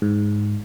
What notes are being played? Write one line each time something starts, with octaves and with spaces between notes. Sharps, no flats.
G#2